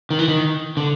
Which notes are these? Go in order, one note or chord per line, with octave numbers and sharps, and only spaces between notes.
D#3
E3
D#3
D3